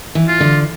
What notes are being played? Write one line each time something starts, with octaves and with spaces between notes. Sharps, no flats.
E3
F4
D3